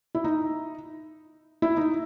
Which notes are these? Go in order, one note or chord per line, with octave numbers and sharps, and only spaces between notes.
E4
D#4
E4
D#4